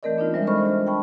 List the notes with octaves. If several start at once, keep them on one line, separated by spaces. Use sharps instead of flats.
E3 A3 C4 A#4 D5 D#5
B3 D4 D#4 F4
G3 G#3 C5 E5
A4 C5 D#5 B5 C#6 F6
D4
G5 A5 B5 C#6